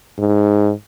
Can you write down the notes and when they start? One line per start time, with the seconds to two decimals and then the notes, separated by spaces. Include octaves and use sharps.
0.18 G#2